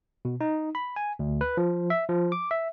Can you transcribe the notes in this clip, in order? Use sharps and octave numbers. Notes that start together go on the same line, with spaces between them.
B2
D#4
B5
G#5
D2
B4
F3
E5
F3
D6
E5